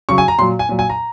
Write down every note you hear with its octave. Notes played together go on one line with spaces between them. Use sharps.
C#3 F#3 C#6
G#5
A#5
A#2 F#3 C6
G#5
A#2 F#3
G#5
A#5